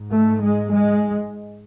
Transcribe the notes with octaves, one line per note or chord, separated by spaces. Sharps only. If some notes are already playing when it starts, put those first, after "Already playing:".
Already playing: G#2
A3
G#3
G#3